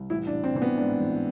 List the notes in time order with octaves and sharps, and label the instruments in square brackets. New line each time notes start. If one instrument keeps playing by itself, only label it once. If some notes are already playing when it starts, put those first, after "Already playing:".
Already playing: [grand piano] C2
A1 E4
D4
A1
C4
E3 C4
B3
G#2 D4
A1